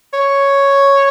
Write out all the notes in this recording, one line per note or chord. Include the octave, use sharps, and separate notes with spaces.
C#5